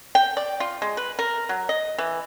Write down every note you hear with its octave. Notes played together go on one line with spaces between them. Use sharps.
G5
D5
F4
G#3
B4
A#4
F#3
D#5
E3